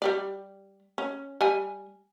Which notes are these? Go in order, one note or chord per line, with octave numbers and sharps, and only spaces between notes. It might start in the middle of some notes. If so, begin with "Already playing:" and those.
G3 G4 D5
C#4
G3 G#5